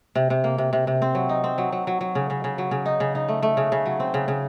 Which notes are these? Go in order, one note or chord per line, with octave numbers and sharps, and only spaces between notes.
C3
C3
A#3
C3
C3
C3
C4
F#3
D#4
C4
F#3
F#3
F#3
F#3
C#3
C#3
C#3
F#3
C#3
D#4
C#3
D#4
A3
A3
C#3
C#3
F#3
C4
C#3
C#3